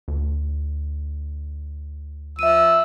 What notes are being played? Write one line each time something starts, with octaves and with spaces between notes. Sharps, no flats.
D2
F3 E5 E6 D#7